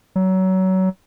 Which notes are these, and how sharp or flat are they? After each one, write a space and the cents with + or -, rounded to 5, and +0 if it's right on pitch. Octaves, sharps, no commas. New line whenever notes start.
F#3 +25